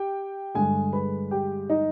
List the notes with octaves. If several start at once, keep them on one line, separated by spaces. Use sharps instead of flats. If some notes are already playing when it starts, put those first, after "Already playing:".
Already playing: G4 G5
G2 D3 G#3 G#4 G#5
B4 B5
G4 G5
D#4 D#5